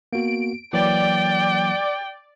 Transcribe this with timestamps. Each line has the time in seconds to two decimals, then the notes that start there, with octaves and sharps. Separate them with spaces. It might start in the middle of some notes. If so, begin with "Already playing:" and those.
0.13 A#3 B3 F#4 D7
0.73 E3 F#3 A#3 D5 G5